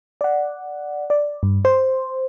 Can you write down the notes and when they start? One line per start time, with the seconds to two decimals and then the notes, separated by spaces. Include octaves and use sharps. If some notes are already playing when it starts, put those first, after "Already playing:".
0.21 D5 F#5
1.10 D5
1.43 G2
1.65 C5